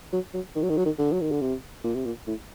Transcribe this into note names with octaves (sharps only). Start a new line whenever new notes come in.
F#3
F#3
D#3
F#3
D#3
F#3
D#3
D3
F#3
D#3
D3
C3
A#2
C3
A#2
A2